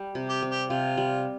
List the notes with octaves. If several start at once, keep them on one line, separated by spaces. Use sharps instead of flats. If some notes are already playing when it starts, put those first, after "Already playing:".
Already playing: G3
C3
G4
C4
G4
C3 F4
G3